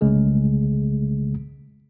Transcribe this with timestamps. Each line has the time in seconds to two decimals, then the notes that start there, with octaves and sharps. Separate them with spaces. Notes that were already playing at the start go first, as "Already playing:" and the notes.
0.01 C2 C#3 G#3 A3